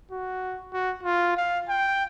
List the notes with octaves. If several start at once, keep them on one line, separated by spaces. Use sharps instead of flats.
F#4
F#4
F4
F5
G5